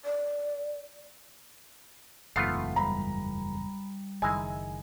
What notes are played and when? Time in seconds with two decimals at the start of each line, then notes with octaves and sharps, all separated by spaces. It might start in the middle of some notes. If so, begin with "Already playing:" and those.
0.05 D5
2.36 F#1 E2 G#2 A3 B3 F4 C7
2.76 G3 A#5 B5
4.22 F#1 D#3 G#3 E4 G#5 A#5